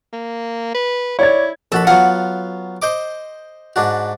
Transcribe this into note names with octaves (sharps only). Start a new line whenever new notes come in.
A#3
B4
E4 C#5 D5 G#6
A#1 F#4 A4 B5
F#3 B3 F4 F#5
C5 D#5 D6
G#2 D4 F#4